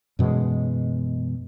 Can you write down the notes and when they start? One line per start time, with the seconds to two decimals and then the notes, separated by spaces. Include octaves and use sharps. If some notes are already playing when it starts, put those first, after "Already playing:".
0.19 F#2 B2 E3 G#3